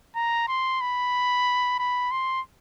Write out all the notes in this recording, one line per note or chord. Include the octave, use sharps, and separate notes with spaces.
A#5
C6
B5
B5
C6